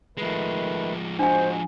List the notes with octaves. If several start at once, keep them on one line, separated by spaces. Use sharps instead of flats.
D#3 F3 G#3 A3 B4
D4 F#4 C5 D#5 G#5